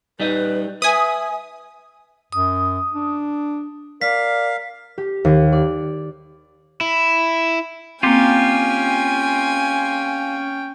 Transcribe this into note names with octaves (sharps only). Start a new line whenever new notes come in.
G3 D#4 B4 D#5
B4 E5 G#5 D#6
F#2 D#6
D4
A#4 D5 F5 B6
G4
D#2
D5
E4
A#3 C4 C#4 F4 G4 G5 G#5